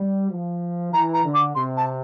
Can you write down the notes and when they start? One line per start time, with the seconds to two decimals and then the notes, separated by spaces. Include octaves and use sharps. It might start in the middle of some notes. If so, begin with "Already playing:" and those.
Already playing: G3
0.30 F3
0.92 E3 A#5
1.13 A#5
1.24 D3
1.34 D6
1.55 C3 C6
1.77 A5